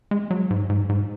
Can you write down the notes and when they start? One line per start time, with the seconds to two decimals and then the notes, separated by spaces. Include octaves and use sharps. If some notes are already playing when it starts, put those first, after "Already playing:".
0.11 G#3
0.31 F#3
0.50 G#2
0.70 G#2
0.89 G#2